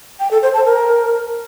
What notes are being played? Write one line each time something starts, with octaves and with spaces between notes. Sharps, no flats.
G5
A4
C5
A5
A#4